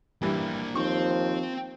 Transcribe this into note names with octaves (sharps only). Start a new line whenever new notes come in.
G2 E3 G3 A#3 D4
D#2 F3 C4 C#6